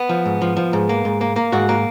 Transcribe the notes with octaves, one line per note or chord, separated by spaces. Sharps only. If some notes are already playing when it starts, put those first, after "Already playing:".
Already playing: B3
F3
G#2
F3
F3
G#2
A#3
G#2
A#3
A#3
G#2 F#4
A#3